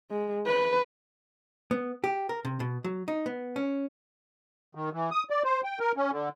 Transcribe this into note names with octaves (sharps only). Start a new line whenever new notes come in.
G#3
B4
B3
G4
A#4
C3
B2
F#3
D#4
B3
C#4
D#3
E3
D#6
D5
C5
G5
A#4
C#4
D3